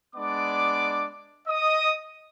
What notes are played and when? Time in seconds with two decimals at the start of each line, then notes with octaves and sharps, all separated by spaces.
0.15 G#3 B3 D4 D5 D6
1.48 D#5 D#6